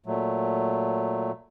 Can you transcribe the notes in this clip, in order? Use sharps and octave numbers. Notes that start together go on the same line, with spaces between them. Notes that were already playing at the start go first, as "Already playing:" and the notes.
A#2 F#3 A3